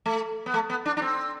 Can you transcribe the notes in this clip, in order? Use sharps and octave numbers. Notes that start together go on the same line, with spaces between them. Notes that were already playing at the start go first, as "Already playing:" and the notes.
A3
B3
A3
B3
D4
D4
C4